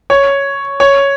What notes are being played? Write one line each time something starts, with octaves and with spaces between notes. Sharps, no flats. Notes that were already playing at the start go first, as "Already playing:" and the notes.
C#5
C#5